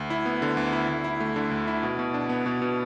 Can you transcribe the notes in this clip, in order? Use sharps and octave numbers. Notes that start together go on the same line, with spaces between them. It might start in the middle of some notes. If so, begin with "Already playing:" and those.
Already playing: D2
E4
B3
D3
D2
E4
D2
E4
A3
D3
D2
E4
B2
B2
D4
B3
B2
B2